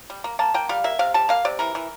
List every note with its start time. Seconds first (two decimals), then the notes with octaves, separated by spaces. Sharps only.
0.10 G3
0.24 A#3
0.39 A#3 A5
0.54 A#3 G5
0.69 G3 F5
0.84 A#3 E5
0.99 C3 F5
1.14 G3 A5
1.29 A#3 F5
1.45 C3 D5
1.59 E3 A#4
1.75 E3